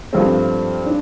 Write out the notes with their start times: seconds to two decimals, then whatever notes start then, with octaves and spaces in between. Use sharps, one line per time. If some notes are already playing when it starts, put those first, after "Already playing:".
0.13 G2 F3 A3 C4
0.86 D4